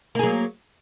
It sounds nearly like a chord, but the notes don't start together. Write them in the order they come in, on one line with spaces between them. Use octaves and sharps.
A#3 G#4 F#3